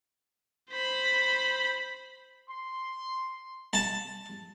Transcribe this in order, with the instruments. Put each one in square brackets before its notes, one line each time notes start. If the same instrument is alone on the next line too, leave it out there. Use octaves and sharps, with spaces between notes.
[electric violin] C5 B5
[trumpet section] C6
[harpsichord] A5